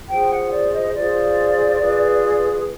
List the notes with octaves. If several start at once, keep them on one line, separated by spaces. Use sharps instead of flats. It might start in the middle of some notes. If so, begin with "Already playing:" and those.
F4 G#4 C5 G5
F#5
D5
D#5
F4 G#4 C5 D5
F4 G#4 B4